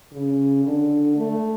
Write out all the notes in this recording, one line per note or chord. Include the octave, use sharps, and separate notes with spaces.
C#3
D3
A3